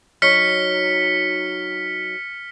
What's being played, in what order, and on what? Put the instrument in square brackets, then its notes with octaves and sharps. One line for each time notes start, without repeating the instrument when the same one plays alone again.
[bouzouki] F#3 D#4 [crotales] F6 B6 C#7